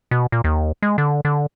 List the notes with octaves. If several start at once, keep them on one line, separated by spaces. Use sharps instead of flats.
B2
A#2
D#2
G#3
D3
D3